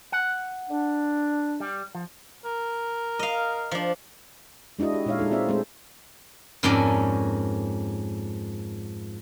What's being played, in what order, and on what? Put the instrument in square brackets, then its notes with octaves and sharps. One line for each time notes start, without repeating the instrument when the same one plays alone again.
[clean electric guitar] F#5
[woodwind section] D4
[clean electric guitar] G3
F3
[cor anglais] A#4
[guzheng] D#5 F5
F3 D4
[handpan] G#3 D4 E4 F#4 D#5
G4
A#2 G#3 D#4 C#5 E5 F5
G#3 D#4 F4 A4
C4 F4 D5 E5
G#3 A3 C4 A4 C5
[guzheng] F2 G#2 A#3 C#4 A4 D5